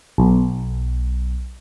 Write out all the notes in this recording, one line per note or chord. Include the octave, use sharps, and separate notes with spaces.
B1